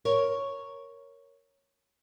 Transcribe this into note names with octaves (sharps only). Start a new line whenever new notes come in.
A#4 C#5